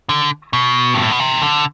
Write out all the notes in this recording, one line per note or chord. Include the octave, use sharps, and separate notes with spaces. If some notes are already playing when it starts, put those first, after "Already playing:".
D3
B2
G2
A2
B2
C3
D3